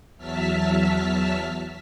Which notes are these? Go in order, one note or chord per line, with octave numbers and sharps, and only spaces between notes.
E2 F#3 E5 A5 F6 B6